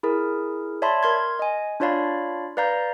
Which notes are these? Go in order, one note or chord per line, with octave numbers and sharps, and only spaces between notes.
E4 G#4 A#4
C#5 D5 E5 A5 B5 C6
A#4 C6 G#6
D#5 G#5
D4 F4 C#5 D5 F5 B5
B4 D5 F5 A#5 G6